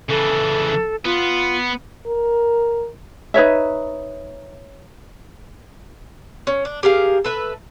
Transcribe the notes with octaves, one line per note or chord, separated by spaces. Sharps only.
C#3 E3 A4
B3 F4
A#4
D#4 B4 C#5 E5
C#4
D4
G4 G#4 A#4 F5
A4 B4 E5